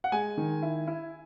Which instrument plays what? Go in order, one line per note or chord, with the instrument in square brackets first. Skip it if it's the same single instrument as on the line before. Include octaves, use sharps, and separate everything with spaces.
[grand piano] F#5
G#3 G#5
D#3
E4
E4